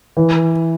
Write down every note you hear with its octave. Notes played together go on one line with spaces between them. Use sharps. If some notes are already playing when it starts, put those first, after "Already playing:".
E3